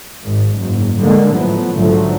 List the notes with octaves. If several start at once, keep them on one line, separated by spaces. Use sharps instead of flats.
G#1 G#2
F#1 G#2
D3 G3 G#3 A#3
A2 F3 F#3 B3
A#1 G#2 D3 F3 F#3 A3